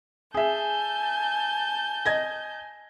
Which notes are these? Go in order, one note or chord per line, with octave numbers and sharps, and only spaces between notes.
G#4 E5 G#5 A5 G6
D#5 G#6 A#6